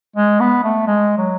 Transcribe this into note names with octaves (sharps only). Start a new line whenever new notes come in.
G#3
B3
A3
G#3
F#3